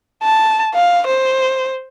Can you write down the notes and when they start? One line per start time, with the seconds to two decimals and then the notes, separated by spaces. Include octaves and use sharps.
0.23 A5
0.74 F5
1.07 C5